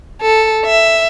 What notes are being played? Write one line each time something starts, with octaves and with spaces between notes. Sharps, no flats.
A4
E5